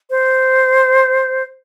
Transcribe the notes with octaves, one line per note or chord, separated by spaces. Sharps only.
C5